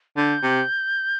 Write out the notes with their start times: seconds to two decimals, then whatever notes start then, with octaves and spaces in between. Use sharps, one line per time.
0.17 D3 G6
0.43 C3